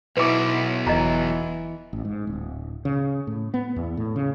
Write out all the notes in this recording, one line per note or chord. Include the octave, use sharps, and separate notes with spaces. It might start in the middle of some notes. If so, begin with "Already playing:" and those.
B1 B2 E4 B4 D6
E1 E3 D#5 A#5
A1
G#2
D1
C#3
A2
B3
E2
A2
C#3